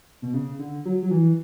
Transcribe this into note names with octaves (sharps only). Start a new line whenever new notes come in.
B2
C#3
D3
F#3
F#3
E3